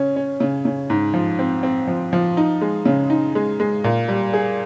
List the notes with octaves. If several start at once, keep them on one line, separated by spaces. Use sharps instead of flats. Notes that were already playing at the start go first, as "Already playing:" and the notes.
Already playing: C#3 C#4
C#4
C#3
C#3
G#2
F3
C4
C4
F3
F3
D#4
G#3
C#3
D#4
G#3
G#3
A#2
G3
G#4